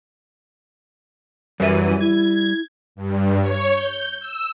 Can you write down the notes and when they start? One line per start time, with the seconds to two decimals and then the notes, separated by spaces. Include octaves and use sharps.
1.60 F#2 E3 G3 D#7
2.01 E4 G#6
2.95 G2
3.40 C#5
3.73 G6
4.19 E6